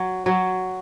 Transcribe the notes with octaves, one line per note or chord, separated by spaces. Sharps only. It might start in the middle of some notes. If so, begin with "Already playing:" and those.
Already playing: F#3
F#3